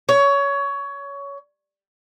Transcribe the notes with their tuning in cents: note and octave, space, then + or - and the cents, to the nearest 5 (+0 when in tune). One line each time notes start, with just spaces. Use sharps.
C#5 +20